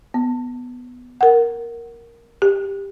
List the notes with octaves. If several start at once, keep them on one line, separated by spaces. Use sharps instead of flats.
B3
A#4 F#5
G4